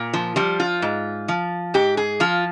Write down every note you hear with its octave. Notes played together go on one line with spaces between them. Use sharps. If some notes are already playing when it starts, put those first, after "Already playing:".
Already playing: A#2
F3
F3 G3
F4
G#2
F3
G#2 G4
G#4
F3 F4